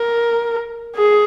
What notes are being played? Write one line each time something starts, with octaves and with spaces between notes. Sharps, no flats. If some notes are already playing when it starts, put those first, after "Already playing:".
Already playing: A#4
G#4